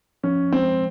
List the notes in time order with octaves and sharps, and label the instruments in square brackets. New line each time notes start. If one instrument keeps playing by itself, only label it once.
[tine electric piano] F3 [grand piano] C#4
[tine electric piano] G#3 [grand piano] C4